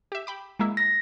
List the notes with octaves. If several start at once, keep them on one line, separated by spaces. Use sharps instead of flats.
G4 E5
G5 B5 D6
G#3 A#3 E4
A#6